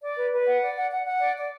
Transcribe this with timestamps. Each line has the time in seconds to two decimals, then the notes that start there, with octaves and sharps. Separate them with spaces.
0.02 D5
0.17 B4
0.32 B4
0.47 F#5
0.62 D5
0.76 F#5
0.92 F#5
1.06 F#5
1.21 D5
1.36 D5